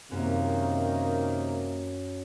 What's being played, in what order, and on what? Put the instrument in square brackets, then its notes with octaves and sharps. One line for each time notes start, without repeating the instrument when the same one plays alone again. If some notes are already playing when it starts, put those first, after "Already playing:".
[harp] F#2 [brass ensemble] C3 D#3 A#3